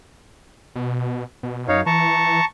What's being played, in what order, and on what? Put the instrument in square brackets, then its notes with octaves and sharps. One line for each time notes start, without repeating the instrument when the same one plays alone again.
[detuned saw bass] B2
B2
[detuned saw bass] F#2 [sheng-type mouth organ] D#4 C#5 F5
[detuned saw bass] E3 [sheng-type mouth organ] A5 A#5 C#6